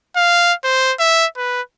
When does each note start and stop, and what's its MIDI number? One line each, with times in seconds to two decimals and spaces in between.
0.16 0.53 77
0.64 0.93 72
0.99 1.26 76
1.36 1.61 71